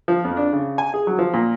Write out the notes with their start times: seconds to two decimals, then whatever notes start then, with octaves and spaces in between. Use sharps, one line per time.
0.08 F3
0.25 F2
0.37 D4
0.53 C#3
0.78 G#5
0.94 G#4
1.07 F#3
1.19 F3
1.34 A#2